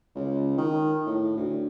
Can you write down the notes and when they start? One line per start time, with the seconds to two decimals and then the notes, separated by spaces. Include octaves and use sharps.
0.16 C#2
0.58 D#3
1.07 A2
1.37 D2